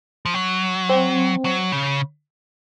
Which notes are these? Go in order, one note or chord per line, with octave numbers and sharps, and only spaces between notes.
F3
F#3
C4
F#3
C#3